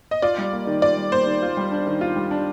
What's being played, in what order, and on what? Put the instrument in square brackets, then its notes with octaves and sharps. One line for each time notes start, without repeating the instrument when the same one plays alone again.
[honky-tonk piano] D#5
[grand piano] F4 [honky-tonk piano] D5
[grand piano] G3
A#3
D#3
[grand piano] F4 [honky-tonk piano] D5
[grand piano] G3
[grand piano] A#3 [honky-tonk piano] C5
[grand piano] D#3
F4
G3
D4
D#3
F4
G3
D4